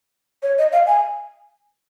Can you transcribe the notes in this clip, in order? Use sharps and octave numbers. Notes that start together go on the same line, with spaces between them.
C#5
D#5
F5
G#5